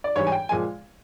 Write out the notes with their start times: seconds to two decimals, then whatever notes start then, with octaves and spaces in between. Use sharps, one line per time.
0.04 D5
0.16 G#2 E3 G3 C#5
0.27 G#5
0.32 G5
0.49 A#2 F3 G#3 G#5